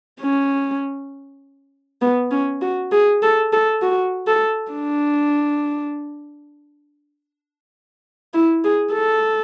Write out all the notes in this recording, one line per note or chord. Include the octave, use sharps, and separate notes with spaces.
C#4
B3
C#4
F#4
G#4
A4
A4
F#4
A4
D4
E4
G#4
A4